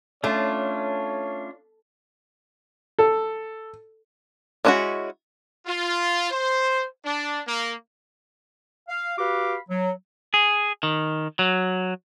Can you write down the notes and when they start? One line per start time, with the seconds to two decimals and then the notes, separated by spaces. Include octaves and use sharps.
0.24 A3 C#4 D4 F4 C#5
2.99 A4
4.65 G#3 C#4 D4 E4 F#4
5.66 F4
6.31 C5
7.05 D4
7.48 A#3
8.89 F5
9.18 F#4 G4 B4 F5 B5 D6
9.69 F#3
10.34 G#4
10.83 D#3
11.39 F#3